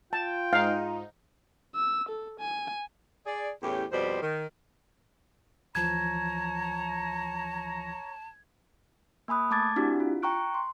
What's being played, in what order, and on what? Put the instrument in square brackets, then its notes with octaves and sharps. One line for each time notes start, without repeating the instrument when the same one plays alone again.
[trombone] F4 [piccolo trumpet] G5 [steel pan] A5
[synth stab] G#2 D#4 [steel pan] F5
[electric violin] E6
A4
G#5
[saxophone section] G#4 D5
E2 A2 C#4 G4
F2 B2 G3 C5
D#3
[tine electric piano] D2 E3 F3 [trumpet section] C#5 A#5 [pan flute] A5 [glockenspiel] G#6
[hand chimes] A#3 G#5 B5 D#6 F#6
A3 A5 D6 G#6 A6
C4 D4 E4 F#4 G4
F4
G5 A#5 C#6 F#6 D7
C6